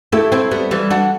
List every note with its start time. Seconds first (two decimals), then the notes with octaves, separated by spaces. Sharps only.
0.12 A3 E4 G4
0.32 C4 E4
0.51 G3 B3
0.71 E3 G3
0.90 D4 F#4